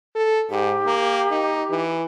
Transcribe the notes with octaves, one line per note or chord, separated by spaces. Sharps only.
A4
G#2 G4
A#3
D#4
E3